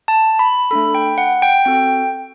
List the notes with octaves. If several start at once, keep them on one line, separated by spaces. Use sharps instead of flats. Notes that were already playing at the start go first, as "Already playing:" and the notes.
A5
B5
A3 D4 A4 B5
G5
F#5
G5
C4 F#4 A4 G5